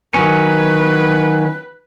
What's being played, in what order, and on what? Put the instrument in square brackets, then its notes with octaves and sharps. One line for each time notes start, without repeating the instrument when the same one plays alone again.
[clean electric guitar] D#3 F#3 C#4 [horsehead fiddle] B4